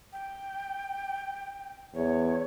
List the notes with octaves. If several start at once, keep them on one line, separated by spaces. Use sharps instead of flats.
G5
E2 C#5